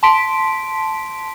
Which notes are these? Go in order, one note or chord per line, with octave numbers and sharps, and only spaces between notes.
A5 C6 B6 D7